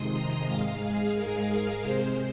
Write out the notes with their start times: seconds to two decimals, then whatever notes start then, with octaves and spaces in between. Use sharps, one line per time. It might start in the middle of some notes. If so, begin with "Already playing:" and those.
Already playing: F2 C3 D#3 G#3 C6 D#6
0.13 A#5
0.46 G#2 G#3 F5
0.80 G#4
1.14 A#4
1.81 C3 G#3 C5